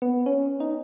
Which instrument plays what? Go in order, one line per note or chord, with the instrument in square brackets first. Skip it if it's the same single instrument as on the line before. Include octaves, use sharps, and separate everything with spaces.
[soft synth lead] B3
C#4
D#4